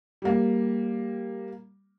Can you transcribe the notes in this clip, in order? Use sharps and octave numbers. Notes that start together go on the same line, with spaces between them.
G3 A#3